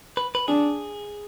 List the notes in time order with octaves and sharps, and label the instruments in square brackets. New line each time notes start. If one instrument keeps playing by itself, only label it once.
[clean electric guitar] B4
B4
[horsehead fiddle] D4 [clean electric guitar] G#4